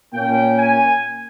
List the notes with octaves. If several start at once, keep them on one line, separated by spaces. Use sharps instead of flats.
A#2 A#3 C#4 G5
G#5